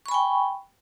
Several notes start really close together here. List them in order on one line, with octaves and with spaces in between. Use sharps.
C#6 B5 G#5 G5